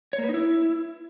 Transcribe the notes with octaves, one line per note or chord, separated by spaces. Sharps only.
C#5
A#3
B4
D#4
E4